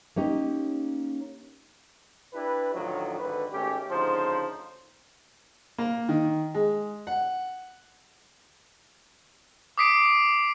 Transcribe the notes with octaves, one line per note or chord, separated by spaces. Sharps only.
A#3 C#4 D#4 G4
D4 E4 G4 B4
A2 D3 D#3 F3 F#3
G#1 D3 B4
G#1 A3 C#4 G4
D2 C#3 F3 D#4 C5
A#3
D#3
G#3
F#5
D6 D#6 B6 C7 D7